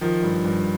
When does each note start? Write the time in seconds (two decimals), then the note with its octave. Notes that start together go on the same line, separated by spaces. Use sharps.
0.01 D#3 F3
0.23 G2
0.45 G2